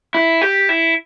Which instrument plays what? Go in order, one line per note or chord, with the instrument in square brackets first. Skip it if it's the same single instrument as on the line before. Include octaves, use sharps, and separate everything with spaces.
[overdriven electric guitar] E4
G4
E4